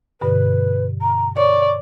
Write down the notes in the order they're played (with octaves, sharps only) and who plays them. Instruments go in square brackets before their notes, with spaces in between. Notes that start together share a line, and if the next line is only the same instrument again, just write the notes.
[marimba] G2 B2 D3 [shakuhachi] B4
[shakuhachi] A#5
[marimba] C#5 [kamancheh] D5 [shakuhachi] C#6